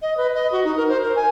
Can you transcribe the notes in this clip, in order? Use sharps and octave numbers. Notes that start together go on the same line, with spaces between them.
D#5
B4
D#5
F#4
D#4
A#4
C5
A#4
G#5